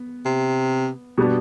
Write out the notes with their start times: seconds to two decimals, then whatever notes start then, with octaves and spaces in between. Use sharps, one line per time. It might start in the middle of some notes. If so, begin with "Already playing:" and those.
Already playing: B3
0.25 C3
1.18 B2 G3 B3 D4